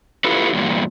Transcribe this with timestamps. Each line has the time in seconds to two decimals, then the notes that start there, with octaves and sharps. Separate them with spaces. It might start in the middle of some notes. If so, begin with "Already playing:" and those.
0.24 E4 F4 G4 A4 B4
0.53 E2 G2 A#2